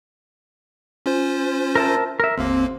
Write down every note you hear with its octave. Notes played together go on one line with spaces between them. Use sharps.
C#4 F4 C5
A#4 E5 A5
A#4 E5
G1 D#2 A#3 C4